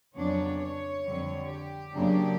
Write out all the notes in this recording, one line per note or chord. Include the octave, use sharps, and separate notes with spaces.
F2 C#3 F#3 B3 D4 C#5
C#5
F2 D3 G3
G4
F#2 C#3 F#3 A#3 D4